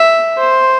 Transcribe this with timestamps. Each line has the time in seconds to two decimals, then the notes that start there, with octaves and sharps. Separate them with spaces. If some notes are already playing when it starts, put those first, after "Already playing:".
Already playing: E5
0.38 C5